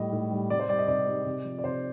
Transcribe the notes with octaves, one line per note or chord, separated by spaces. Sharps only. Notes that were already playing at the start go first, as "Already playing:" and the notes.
Already playing: A2 G3 D#5
A2
G3
C3 D5
C5
G3 D5
D#5
C3 D5
G3
C3
F3
D5
C3 C5